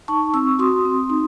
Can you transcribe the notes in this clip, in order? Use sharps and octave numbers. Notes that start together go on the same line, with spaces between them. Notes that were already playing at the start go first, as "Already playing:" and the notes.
D#4 A5 C#6
C4 C#6 E6
F#4 C6 D#6
C4
D#4